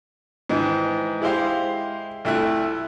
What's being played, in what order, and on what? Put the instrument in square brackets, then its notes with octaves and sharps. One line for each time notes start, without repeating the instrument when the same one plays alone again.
[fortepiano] G#2 D#3 E3
G#3 E4 G4 C5 F5
C2 A3 E4 F#6